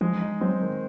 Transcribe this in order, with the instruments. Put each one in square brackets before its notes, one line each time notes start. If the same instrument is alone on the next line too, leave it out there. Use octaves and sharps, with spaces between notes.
[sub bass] F3 [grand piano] G#3
[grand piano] D#4
[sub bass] F#3 [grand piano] C4
[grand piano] D#3